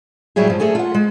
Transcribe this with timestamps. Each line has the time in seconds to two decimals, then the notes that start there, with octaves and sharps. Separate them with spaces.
0.36 A2 F#3 G3 E4 G#4
0.47 G2 F3
0.60 A3 G#4 A4 G#5
0.75 F4 F#5
0.94 G#3